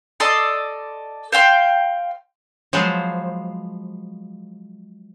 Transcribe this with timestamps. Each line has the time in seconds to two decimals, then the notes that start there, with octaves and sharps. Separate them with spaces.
0.20 A4 D5 D#5 C6
1.32 C5 F5 G5 C6
2.73 F3 F#3 G#3 B3 G#4 C5